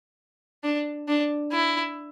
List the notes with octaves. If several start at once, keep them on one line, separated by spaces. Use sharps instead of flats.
D4
D4
E4